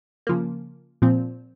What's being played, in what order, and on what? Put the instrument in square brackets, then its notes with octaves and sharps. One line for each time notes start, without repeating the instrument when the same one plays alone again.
[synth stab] C#3 F3 A#3
A#2 F3 C4